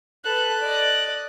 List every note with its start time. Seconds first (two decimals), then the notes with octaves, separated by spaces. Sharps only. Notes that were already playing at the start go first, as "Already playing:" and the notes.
0.25 A4 B4 F#6
0.61 D5 D#5